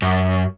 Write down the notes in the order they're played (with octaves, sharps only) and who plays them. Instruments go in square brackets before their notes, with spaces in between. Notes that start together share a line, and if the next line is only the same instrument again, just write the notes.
[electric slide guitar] F#2